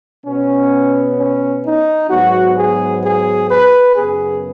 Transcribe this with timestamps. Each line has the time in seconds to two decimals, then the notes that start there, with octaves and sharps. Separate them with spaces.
0.25 B2 B3 C#4
1.17 C#4
1.65 D#4
2.10 G#2 F#3 B3 F#4
2.57 G#4
3.04 G#4
3.50 B4
3.96 F#2 C#3 B3 G#4